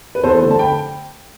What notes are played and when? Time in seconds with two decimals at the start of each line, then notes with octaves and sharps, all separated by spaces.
0.15 B4
0.23 E2 A4 C5
0.42 D3 A3
0.51 A5
0.59 G5 B5